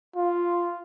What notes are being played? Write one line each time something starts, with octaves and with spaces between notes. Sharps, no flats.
F4